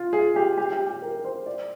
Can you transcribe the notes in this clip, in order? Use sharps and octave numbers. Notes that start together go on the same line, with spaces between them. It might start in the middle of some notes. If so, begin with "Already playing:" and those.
Already playing: F4
G#4
G4
G4
G4
G4
A#4
C5
D5